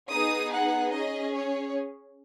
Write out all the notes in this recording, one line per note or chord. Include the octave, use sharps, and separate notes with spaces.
B3 D#4 G#4 D#6
F#5
C#4 G#4 D#5
C#5